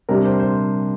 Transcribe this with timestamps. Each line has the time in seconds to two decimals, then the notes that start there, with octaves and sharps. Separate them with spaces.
0.09 C3 G3 D4 A#4
0.25 C5
0.40 C5